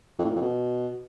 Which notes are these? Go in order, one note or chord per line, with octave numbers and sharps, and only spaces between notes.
F2
A2
A#2
F2
B2